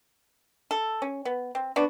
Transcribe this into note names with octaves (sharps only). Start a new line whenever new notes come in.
A4
C#4
B3
C4
B3 D4 F#4